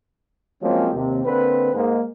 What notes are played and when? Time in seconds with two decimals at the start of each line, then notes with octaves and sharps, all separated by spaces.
0.63 F3 F#3 G#3 A#3 C4 C#4
0.94 D#2 C3
1.24 D3 A#3 C4 B4
1.74 G#2 G#3 A#3